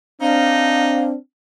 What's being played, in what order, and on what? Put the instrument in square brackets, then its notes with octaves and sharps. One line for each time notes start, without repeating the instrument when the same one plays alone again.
[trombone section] C4 D4 [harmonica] D#4 [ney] F5